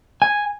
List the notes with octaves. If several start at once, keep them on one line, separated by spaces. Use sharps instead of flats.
G#5